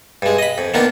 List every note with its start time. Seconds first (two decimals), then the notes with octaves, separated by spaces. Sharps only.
0.22 G2 G#3
0.38 D#5 B5
0.58 F2
0.74 D#3 A#3 B3 D4